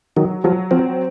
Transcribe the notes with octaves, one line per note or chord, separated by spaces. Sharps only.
D#3 F#3
F3 F#3
F3 C4